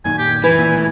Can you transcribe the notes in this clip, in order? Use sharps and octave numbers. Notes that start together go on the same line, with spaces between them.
F#2 A#2 D#3 G#5
G4
E3 B4 G#5
A#2
A1 A2